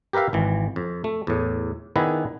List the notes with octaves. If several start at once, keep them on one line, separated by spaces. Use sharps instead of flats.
G4 A#4 B4 E5 F5
G#1 E3
F2
A3
E2 A2
D#3 B3 D4 E4 G#4 B4